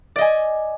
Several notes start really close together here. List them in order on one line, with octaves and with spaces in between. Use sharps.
D5 D#5 G#5